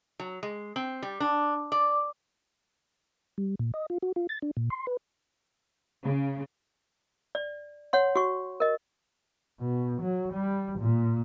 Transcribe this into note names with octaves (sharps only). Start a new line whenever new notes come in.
F#3
G#3
C4
G3
D4
D5
G3
A#2
D#5
F4
F#4
F4
A6
D4
A#2
C6
B4
C#3
D5
C#5 F#5 C6
F#4 C#6
A#4 D#5
B2
F#3
G3
A#2